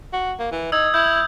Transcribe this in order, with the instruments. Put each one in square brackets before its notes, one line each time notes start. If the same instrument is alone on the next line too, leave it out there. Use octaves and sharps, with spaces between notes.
[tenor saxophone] F#4
A#3
E3
[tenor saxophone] D#4 [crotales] D#6 E6 G#6
[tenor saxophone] E4 [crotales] G6